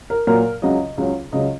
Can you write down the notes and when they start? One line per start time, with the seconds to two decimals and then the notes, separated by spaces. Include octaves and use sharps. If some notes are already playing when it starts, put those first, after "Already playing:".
0.10 A#4
0.27 A#2 F#3 A#3 A#4
0.62 C#2 C#3 F#3 C#4 D#5
0.97 C#2 C#3 F#3 C#4
1.32 C#2 C#3 F#3 C#4 D#5